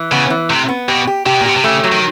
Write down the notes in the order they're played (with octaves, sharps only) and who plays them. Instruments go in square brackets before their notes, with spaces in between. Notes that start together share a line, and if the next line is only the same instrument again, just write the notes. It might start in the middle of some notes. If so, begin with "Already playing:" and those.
Already playing: [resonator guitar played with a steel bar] E3
[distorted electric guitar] C#3 [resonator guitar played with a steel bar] B3
[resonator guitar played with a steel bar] E3
[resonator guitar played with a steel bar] A2 [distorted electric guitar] C3
[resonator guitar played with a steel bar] B3
[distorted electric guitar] B2 [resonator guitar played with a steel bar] G4
[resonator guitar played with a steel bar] G4
[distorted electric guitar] C3 [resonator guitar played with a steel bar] G4
[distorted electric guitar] B2
A#2
[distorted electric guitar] B2 [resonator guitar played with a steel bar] G4
[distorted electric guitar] C3
[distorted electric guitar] C#3 [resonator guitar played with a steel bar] A3
[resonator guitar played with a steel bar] F#3
[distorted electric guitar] D#3